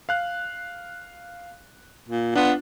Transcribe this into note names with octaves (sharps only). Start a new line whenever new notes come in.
F5 F#6
A#2
B3 D4 F4